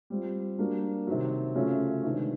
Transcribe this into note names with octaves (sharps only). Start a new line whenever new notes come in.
G3 C4 F4
G3 A#3 D4 F#4 A#4
C3 D#3 F#3
C#3 F#3 A3 C#4 F4
C3 D#3 G#3 B3 D4